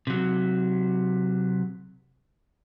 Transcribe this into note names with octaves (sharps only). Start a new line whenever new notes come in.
C3 F#3